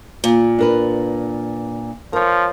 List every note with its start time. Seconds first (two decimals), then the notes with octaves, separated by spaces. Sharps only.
0.24 A#2
0.59 D4 A#4 B4
2.13 F3 A#4 C#5